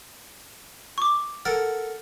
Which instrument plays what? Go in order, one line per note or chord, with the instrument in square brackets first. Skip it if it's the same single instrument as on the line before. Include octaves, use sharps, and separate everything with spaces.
[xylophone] C#6 D6
[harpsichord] A4 A#4 F#5